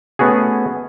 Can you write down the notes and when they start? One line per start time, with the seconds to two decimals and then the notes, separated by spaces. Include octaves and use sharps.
0.19 A3 B3 C#4 F#4 G#4